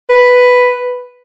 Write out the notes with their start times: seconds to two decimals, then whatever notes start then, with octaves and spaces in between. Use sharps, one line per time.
0.10 B4